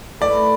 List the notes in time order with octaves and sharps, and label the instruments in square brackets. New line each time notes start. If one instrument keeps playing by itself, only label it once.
[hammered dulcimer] A3 E4 B4 [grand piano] D5